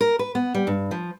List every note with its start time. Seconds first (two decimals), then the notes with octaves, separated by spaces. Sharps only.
0.01 A#4
0.19 B4
0.35 B3
0.54 G3
0.67 G2
0.91 F3